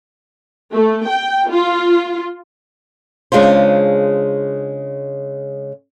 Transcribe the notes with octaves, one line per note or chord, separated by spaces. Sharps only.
A3
G5
F4
C#3 G#3 D4 F4 C5